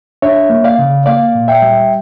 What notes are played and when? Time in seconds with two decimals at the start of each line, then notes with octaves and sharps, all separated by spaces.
0.22 D4 C#5 E5
0.50 A#3
0.64 D5 F5
0.79 C#3
1.06 A#3 D5 F5
1.35 A#2
1.48 E5 G5
1.62 G3